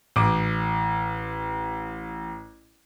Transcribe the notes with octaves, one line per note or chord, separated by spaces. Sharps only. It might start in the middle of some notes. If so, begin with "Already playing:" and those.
A1 D6